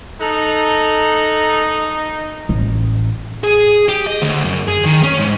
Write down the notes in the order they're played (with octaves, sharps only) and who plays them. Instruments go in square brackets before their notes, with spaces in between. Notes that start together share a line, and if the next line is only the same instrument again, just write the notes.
[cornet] D#4 [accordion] A4 A#5 F#6
[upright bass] A1
[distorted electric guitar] G#4
G4
D#5
D2
F#2
G#4
D#3
C#4
G#2